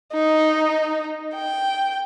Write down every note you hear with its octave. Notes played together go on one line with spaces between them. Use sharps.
D#4
G5